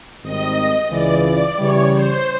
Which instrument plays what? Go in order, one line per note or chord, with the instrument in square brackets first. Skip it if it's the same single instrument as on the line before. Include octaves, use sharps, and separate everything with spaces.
[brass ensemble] G#1 G#2 D#3 G3 C4 [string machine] D#5
[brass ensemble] C#2 C#3 E3 [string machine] D5
[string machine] D5
[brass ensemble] C#3 E3 G3 [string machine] C#5
[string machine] C5